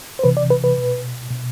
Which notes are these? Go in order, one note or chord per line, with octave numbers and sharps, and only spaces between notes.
C5
C3 E3 B4
D5
B4
B4
B2
B2